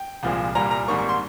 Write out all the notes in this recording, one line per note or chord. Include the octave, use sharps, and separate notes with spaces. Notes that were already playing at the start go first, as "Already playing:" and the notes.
Already playing: G5
C2 A#2 F3 G#3
C2 A#2 G3 A#5
A#5
G#1 G#2 G3 A#3 C#6
C#6
C6